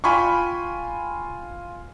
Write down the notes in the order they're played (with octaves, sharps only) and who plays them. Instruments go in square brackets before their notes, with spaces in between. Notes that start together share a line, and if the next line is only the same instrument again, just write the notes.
[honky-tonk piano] F4 G#5 [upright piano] G5 B5 C#6